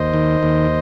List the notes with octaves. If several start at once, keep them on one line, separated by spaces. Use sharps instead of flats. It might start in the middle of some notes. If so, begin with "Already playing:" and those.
Already playing: D#2 C5 D#5
D#3
D#2